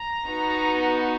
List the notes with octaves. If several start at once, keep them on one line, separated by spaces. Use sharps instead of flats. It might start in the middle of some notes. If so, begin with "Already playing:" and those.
Already playing: A#5
B3 D#4 F#4